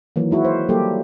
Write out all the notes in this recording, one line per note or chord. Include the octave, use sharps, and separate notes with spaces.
D#3 E3 F#3 A#3
G#3 E4 F#4
C5
F#3 G3 A#3 G4 A4